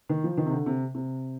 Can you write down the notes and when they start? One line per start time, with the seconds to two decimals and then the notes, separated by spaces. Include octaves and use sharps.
0.09 D#3
0.24 F3
0.37 D#3
0.46 C3
0.53 D3
0.66 C3
0.95 C3